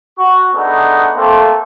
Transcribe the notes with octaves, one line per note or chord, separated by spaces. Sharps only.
F#4 C#6
A3 B3 D4 D#4 G#4
A3 A#3 C4 F4 A4